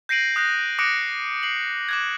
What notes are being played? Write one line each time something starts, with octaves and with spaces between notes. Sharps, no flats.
G6 A#6 C7 D7 D#7 F#7
D#6 F#6 G6 A#6
D6 D#6 F#6 A#6 C#7 D7
C7 F#7
D6 F#6 G#6